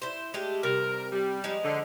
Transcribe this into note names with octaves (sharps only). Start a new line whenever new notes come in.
E4 C5
G#3 A3 G4
C3 G3 A#4
G3
F3 G#3 D#4
D3